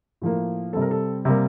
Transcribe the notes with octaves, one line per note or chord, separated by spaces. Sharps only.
A2 F3 A#3
C3 G3 C4 A4
A#4
A4
C3 G3 A#3